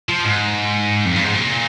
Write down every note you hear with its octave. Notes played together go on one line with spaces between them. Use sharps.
F3
G#2
F2
G2
G#2
A#2